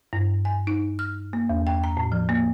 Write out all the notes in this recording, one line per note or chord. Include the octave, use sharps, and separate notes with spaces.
G2
G#5
D#4
F6
A#3
E2
G5
A#5
A2
F3
A#3